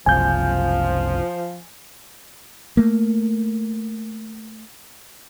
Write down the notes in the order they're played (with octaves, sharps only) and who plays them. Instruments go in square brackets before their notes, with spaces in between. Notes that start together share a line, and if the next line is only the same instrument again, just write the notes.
[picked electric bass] F#1 C2 [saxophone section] F3 [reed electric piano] G#5 G6
[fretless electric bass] A3 A#3